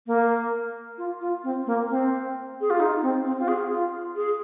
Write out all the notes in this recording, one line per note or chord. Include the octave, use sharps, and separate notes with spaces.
A#3
F4
F4
C4
A#3
C4
G#4
F4
D#4
C4
C4
F4
G#4
F4
G#4